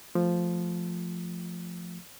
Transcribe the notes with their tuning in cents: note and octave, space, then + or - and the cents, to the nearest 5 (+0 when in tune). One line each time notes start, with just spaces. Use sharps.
F3 +0 A3 +0